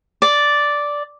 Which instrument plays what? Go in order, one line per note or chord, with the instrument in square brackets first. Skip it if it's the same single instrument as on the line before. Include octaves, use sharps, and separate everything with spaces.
[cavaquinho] D5